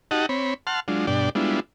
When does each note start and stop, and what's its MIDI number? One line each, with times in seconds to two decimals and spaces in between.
0.11 0.26 63
0.11 0.26 66
0.11 0.26 67
0.11 0.26 75
0.11 0.26 78
0.11 0.26 81
0.29 0.54 60
0.29 0.54 73
0.29 0.54 83
0.67 0.80 78
0.67 0.80 81
0.67 0.80 84
0.67 0.80 89
0.88 1.06 54
0.88 1.06 56
0.88 1.06 62
0.88 1.06 65
1.07 1.30 43
1.07 1.30 47
1.07 1.30 62
1.07 1.30 74
1.07 1.30 79
1.35 1.60 55
1.35 1.60 56
1.35 1.60 59
1.35 1.60 62
1.35 1.60 64
1.35 1.60 65